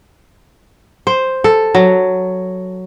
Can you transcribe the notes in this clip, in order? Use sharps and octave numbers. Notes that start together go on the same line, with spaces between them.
C5
A4
F#3